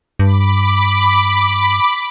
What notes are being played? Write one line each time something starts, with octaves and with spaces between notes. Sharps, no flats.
G2 B5 D6